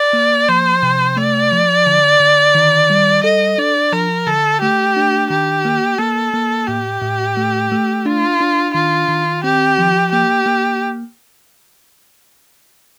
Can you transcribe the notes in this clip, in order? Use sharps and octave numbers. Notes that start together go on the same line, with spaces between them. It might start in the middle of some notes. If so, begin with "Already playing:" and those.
Already playing: D5
A#3
F3 C5
C3
A3 D5
F3
D3
D3
D#3
G3
A4 D#5
D4 D5
F3 A#4
D3 A4
A3 G4
D4
D#3 G4
A#3
A#3 A4
A#3
A2 G4
A2
A3
A3
D4 F4
D4
D#3 F4
D#3
C4 G4
F3
A#3 G4
A#3